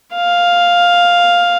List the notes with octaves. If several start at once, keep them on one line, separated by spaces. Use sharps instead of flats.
F5